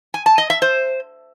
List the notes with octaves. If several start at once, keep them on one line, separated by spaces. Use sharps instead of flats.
G#5
A5
D#5
E5
C5